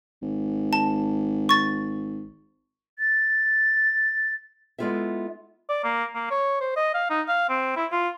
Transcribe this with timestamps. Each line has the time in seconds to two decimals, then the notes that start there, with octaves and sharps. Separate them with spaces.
0.22 G#1
0.73 A5
1.49 C#6 A6
2.99 A6
4.78 G#3 B3 E4 F4 A4 E5
5.69 D5
5.84 A#3
6.15 A#3
6.31 C#5
6.60 C5
6.76 D#5
6.94 F5
7.10 D#4
7.28 F5
7.49 C4
7.76 E4
7.92 F4